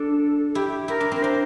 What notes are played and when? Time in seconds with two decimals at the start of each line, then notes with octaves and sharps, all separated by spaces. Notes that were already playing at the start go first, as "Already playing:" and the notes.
Already playing: D4 A4
0.55 E4 G4
0.88 E4 A#4
1.00 D4
1.12 C4 A#4
1.22 D4 C5